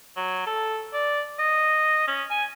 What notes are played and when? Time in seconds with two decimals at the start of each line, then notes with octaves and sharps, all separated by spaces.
0.16 F#3
0.47 A4
0.93 D5
1.39 D#5
2.08 C#4
2.31 G#5